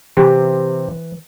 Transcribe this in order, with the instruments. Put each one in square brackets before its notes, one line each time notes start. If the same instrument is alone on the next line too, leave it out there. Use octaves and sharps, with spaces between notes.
[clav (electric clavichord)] C3 C4 G4 [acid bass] E3